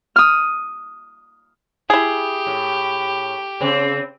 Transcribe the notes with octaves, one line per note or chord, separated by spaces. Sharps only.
D#6 F6
E4 G4 G#4
A2
C#3 C4